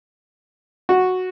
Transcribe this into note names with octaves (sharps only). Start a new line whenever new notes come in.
F#4